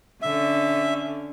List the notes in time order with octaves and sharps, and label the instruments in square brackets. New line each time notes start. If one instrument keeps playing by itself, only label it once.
[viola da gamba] D3 C#4 [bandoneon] E5